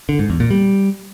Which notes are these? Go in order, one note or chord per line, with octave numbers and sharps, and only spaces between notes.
D3
G#2
E2
A#2
G3